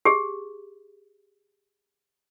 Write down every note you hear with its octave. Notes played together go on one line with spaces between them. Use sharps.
G4 G#4